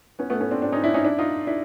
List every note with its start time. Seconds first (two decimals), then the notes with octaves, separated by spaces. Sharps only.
0.19 B3 C#4
0.30 A3 B3
0.41 B3 C#4
0.51 C4 D4
0.62 C4 D4
0.72 C#4 D#4
0.84 D4 E4
0.94 C#4 D#4
1.04 D4 E4
1.19 D#4 F4
1.47 D4 E4